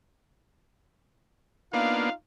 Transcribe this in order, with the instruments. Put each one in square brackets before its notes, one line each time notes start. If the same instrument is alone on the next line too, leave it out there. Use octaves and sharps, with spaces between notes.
[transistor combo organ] A#3 B3 D4 [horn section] D#4 F4 F5